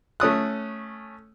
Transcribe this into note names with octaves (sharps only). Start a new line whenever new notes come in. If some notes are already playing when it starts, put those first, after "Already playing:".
A3 C#4 D#6 F#6